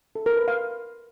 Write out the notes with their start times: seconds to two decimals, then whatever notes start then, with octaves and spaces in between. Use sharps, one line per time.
0.15 A4
0.26 A#4
0.37 B4
0.48 F5